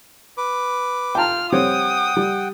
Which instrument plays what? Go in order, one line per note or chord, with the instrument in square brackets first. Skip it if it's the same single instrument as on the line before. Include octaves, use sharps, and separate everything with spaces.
[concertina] B4 D6
[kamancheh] F4 F6 [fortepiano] G5 A5 A#5
[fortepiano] G3 C4 C#5 [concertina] F#5 G5 [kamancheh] D#6
[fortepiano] G3